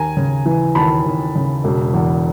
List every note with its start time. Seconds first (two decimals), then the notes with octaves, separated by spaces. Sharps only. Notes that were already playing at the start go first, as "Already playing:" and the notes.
Already playing: D#2 G#5 A#5
0.17 C#3
0.46 E3
0.75 D#2 A5 B5
1.05 D#2
1.35 C#3
1.64 E1
1.94 E2